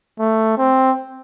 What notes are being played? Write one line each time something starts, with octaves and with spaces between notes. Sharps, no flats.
A3
C4